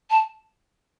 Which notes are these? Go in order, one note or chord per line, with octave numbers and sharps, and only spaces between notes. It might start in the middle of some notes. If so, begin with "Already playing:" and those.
A5